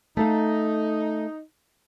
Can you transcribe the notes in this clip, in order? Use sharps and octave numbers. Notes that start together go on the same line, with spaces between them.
A3 D#4 A4 F5